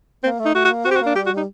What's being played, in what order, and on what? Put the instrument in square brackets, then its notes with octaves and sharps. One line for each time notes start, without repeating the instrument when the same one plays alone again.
[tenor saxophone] A#3 [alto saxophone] C4
[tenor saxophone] A3
[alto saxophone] D#4
[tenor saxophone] A3 [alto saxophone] F#4
[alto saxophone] F#4
[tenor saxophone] A#3
[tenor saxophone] C4 [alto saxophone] F#4
[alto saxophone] G4
F#4
[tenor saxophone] A#3 [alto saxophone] D4
[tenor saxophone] G3 [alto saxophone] G4
[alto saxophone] F#4
[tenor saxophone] G3
[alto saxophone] D#4